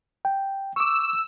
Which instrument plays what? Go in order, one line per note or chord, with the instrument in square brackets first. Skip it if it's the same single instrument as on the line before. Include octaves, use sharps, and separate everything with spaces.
[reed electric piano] G5
[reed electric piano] C#6 D6 [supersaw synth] E6